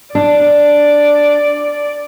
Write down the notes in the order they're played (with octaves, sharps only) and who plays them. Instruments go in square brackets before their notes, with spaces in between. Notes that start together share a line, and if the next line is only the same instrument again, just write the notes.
[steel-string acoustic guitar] D4 [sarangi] D5